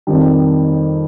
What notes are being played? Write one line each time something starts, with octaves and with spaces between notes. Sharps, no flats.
F2 D#3 G3